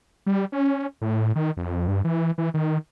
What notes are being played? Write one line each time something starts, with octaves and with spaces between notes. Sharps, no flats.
G3
C#4
A2
D#3
F2
G2
E3
E3
D#3